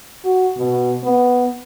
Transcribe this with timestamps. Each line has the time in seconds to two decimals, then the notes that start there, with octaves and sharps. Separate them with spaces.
0.25 F#4
0.57 B2
1.04 B3